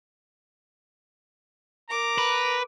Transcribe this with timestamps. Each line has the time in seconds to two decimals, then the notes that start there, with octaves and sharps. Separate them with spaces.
1.90 A#4 A#5 D6
2.18 B4